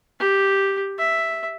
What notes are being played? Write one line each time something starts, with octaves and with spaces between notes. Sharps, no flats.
G4
E5